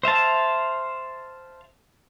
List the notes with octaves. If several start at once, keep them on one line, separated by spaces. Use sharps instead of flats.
C5 E5 F5 A5